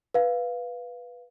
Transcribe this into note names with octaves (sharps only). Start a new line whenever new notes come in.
B4 F5